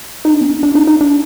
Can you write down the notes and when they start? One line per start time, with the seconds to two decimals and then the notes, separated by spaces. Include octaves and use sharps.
0.25 D#4
0.33 D4
0.41 B3
0.49 D4
0.63 D4
0.75 D#4
0.87 D#4
1.01 D4